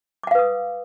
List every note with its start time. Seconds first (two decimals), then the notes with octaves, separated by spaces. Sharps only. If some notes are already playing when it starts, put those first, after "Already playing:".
0.23 D6
0.27 F#5
0.31 F5
0.35 B4
0.39 D#6